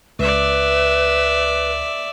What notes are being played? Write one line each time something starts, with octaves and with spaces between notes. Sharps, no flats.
C#2 B4 D5 E5